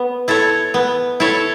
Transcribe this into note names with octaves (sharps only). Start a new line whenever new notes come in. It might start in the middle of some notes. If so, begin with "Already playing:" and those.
Already playing: B3
E4 A4 C#5
B3
E4 A4 C#5